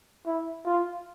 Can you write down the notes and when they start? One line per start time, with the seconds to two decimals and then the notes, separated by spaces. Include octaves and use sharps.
0.26 E4
0.66 F4